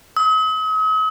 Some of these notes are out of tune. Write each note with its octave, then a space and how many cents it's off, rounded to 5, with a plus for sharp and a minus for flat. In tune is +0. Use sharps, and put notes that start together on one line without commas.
D#6 +45